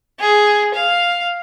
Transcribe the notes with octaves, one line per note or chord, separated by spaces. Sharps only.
G#4
F5